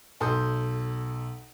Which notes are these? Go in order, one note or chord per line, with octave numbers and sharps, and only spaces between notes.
B1 A4 C6 D#6 G6